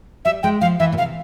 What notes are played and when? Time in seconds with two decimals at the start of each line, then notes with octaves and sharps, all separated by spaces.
0.25 G3 E5
0.43 G#3 G5
0.61 F3 F5
0.80 E3 E5
0.92 A#2
0.97 C3 F5